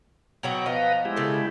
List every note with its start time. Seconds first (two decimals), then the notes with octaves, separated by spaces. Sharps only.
0.43 B2 F#3 F#4 F#5 G5 A#5
0.66 F3 B3 B4 D#5 A#5
1.05 G#3 E4 G4
1.16 C#3 B3 A4